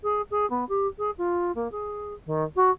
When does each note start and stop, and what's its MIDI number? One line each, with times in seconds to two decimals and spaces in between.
0.03 0.22 68
0.31 0.48 68
0.50 0.67 59
0.69 0.87 67
0.98 1.10 68
1.18 1.51 65
1.55 1.70 58
1.72 2.14 68
2.26 2.44 51
2.56 2.70 66